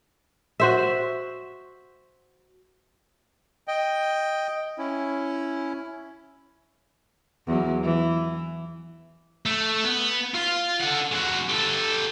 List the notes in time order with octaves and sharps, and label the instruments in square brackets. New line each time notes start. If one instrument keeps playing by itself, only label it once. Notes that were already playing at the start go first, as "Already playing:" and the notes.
[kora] F#4 C5 E5
[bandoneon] D#5 G5
C#4 E4
[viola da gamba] E2 F#3
E3
[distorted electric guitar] A3
B3
F4
A4 F#5
G#3 F#4
G4 A4